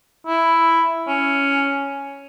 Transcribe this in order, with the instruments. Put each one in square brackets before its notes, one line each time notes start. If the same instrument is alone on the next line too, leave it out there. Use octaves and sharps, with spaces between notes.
[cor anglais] E4
C#4